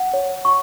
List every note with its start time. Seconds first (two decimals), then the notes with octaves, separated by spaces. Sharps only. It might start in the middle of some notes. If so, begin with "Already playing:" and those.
Already playing: F#5
0.13 C#5
0.45 C#6